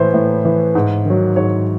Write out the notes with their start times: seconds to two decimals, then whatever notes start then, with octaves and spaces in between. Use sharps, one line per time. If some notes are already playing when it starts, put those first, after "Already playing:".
Already playing: A2 E3 B4 C5
0.14 A2
0.45 E3
0.75 G#2
1.05 D#3 F#3
1.36 G#2 C#5